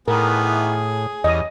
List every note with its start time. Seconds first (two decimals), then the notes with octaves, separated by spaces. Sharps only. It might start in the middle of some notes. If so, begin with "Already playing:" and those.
0.08 A2 D#3 E3 B3 G#4 A#4
1.24 E2 G3 C#4 D#5 D#6